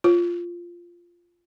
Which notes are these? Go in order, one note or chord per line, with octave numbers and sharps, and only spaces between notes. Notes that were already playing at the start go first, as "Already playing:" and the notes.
F4